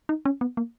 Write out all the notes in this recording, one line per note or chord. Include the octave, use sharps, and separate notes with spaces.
D#4
C#4
B3
A#3